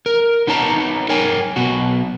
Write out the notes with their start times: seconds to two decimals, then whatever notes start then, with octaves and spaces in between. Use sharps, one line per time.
0.06 A#4
0.47 B3 D#4 C#5 A5 A#5
1.09 A#4 C#5 G5 G#5
1.56 B1 B2 F#4